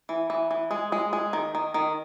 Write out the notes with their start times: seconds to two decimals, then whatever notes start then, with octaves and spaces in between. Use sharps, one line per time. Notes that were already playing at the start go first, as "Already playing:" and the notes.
0.09 E3
0.30 E3
0.51 E3
0.71 G#3
0.92 G#3
1.13 G#3
1.33 D#3
1.55 D#3
1.74 D#3